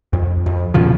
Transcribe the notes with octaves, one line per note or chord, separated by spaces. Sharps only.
F2
F2
E2 A#2 C#3 F3